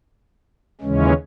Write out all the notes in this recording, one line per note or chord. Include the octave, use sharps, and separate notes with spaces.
D#2 C#3 E3 G#3 C#4